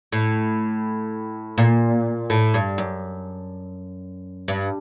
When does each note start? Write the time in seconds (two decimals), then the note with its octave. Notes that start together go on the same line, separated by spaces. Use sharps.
0.12 A2
1.58 A#2
2.30 A2
2.54 G2
2.78 F#2
4.48 G2